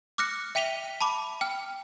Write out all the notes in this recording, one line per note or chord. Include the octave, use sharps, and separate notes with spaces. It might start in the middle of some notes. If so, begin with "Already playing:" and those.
D6 F6 F#6 A#6 C#7
E5 G5 B6 D#7 F7 G7
A5 B5 D6
G5 F6